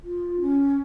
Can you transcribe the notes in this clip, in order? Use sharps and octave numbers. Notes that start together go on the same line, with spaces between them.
F4
C#4